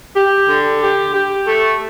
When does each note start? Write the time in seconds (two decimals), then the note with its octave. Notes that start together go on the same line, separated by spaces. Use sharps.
0.16 G4
0.49 D3
0.82 G4
1.14 G4
1.47 A3